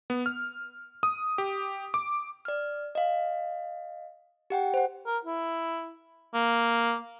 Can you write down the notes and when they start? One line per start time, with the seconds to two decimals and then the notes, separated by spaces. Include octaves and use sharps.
0.10 B3
0.26 F6
1.03 D#6
1.38 G4
1.94 D6
2.45 D5 F6
2.95 D#5 F5
4.50 G4 F#5 G5
4.74 C5 F#5
5.06 A#4
5.25 E4
6.34 A#3